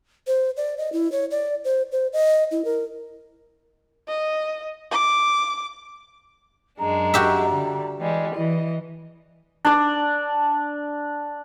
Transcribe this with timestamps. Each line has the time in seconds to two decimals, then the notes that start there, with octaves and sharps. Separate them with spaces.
0.27 C5
0.57 D5
0.78 D#5
0.93 E4
1.12 C#5
1.31 D5
1.64 C5
1.92 C5
2.13 D#5
2.51 E4
2.65 A#4
4.08 D#5
4.91 D6
6.79 F#2 G#3 D4 A#5
7.14 F#4 G4 E5
7.49 D3 G3
7.99 E3 G3 G#3
8.34 E3 E4 D#5
9.65 D4 D5